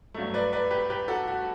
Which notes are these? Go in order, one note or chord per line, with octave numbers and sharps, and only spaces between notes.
G2 F#3 A3
B4 D5
B4 D5
G4 B4
G4 B4
F#4 A4
F#4